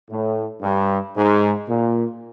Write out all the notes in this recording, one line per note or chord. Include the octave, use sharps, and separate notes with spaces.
A2
G2
G#2
A#2